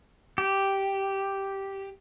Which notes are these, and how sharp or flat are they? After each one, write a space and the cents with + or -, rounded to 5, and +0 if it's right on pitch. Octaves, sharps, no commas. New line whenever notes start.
G4 -5